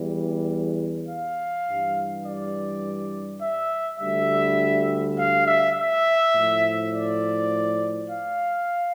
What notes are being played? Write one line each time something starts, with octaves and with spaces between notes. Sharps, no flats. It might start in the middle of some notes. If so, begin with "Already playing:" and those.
Already playing: E2 E3 G3
F5
G2 E3 G3
D5
E5
D2 D3 G3 E5
F5
E5
E5
A2 F3
D5
F5